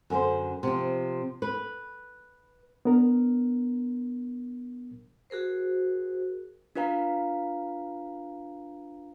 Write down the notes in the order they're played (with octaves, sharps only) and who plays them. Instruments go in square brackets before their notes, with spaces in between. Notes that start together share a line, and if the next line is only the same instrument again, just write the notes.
[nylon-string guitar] F#2 D3 A#4 C5
C3 F3
B4
[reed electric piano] B3 D4 A#4
[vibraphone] F#4 G#4 A#4 C5
[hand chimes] D4 F4 B4 F5 A#5